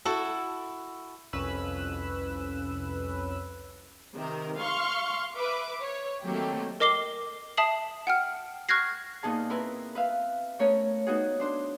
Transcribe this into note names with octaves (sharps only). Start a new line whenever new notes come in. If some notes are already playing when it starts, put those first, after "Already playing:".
E4 F#4 A4
C2 F2 C#4 B4 E6 F#6
C3 D#3 A#4
F5 C6 C#6
B4 E5 D6
C#5
D#3 F#3 A3 A#3 C4 G4
A#4 D#5 D6 C7 G7
E5 A5 D#6 C7 F#7
F#5 G5 F6
C#6 F6 F#6 G#6 A#6 C7
A#2 B3 D#4 G#4 A5
C4 E4 A#4 B4
B4 E5 F5
A3 B3 C#4 A#4 C#5
B3 D#4 F#4 G#4
D4 C5